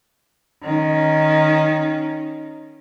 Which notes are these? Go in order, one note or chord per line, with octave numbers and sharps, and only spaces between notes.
D#3 C#4